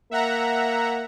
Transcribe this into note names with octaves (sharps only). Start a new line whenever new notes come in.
A#3 E5 F#5 A#5